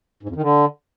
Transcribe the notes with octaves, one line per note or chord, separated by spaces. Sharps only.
G#2
F2
D#3
D3